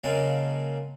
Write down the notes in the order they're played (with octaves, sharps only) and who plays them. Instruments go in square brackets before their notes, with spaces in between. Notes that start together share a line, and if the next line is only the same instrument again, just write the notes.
[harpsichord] C#3 F#3 G#3 A#3 G#5 A5